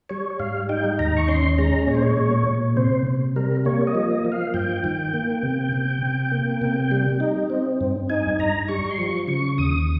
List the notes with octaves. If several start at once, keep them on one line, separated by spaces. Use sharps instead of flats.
G3 C#5
G#2 F5
D#4 G5
D#2 A#5
C#6
C#4 C6
G#3 A#5
A#2 C#5
C5
C#5
A#2
A#2
C3 C5
C3
G3 A#4
A#3 C#5
D#5
F3
D#5
F3
F5
G2 G5
D#3
A#3
C3
C3
C3
A#3
C3
G3
D#4
C4
G2
D#4 G#5
G2 A#5
G3 C#6
C6
F3 C#6
C#3 C#6
D#2 D#6